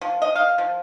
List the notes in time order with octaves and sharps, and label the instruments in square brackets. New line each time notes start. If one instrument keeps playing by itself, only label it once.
[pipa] F3
D#5
F5
F3